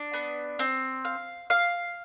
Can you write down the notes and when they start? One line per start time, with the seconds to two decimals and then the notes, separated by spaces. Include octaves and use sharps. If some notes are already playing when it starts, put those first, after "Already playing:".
Already playing: D4
0.14 B3
0.59 C4
1.05 F5
1.50 F5